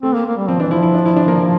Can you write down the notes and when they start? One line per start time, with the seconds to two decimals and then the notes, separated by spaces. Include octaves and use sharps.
0.03 A3 C4
0.15 A#3
0.26 A#3
0.37 G3
0.48 F3 C4
0.60 E3 D4
0.71 F3 E4
0.83 E4
0.94 D4
1.06 E4
1.16 D4
1.28 A#3